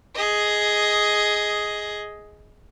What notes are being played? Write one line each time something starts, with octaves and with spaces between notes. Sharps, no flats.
G#4 D#5